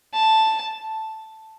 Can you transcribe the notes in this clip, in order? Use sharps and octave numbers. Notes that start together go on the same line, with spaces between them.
A5